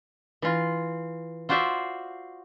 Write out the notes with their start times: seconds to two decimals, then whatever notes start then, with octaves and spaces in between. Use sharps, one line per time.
0.42 E3 F4
1.49 F4 F#4 C5 D5 E5